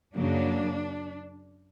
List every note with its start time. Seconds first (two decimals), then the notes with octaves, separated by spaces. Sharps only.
0.15 F#2 C#3 F#3 A#3 D4